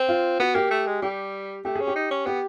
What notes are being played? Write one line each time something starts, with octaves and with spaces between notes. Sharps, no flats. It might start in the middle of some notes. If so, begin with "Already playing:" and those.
Already playing: C4
F4
B3 F#4
A#3 G4
A3
G#3
G3 G4
A3 G4
G#4
C#4
G4
D#4
C#4
B3 G4